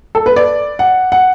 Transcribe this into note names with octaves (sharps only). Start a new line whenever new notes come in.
A4
B4
D5
F#5
F#5